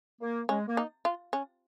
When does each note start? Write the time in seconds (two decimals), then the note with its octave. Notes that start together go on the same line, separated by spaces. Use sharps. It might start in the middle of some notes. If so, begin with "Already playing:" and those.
0.21 A#3
0.49 G#3 C#4
0.67 A#3
0.77 D#4
1.05 F4
1.33 C#4